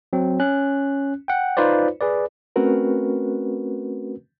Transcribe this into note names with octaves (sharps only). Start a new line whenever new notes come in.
F#3 C4
C#4 F#6
F#5 G5
D#4 F4 B4 C5 D5
G#4 B4 D5
A3 C4 C#4 F#4 A#4 B4